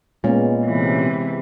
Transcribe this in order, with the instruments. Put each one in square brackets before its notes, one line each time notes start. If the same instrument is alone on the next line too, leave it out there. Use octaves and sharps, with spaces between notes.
[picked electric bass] A#2 [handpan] G#3 B3 [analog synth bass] C#4
[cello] C3 E3